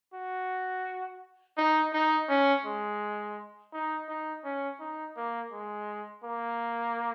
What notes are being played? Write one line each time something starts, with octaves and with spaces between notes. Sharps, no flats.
F#4
D#4
D#4
C#4
G#3
D#4
D#4
C#4
D#4
A#3
G#3
A#3